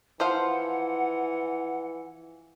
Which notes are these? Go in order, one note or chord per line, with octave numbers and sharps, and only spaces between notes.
E3 F3 C5 F5 F#5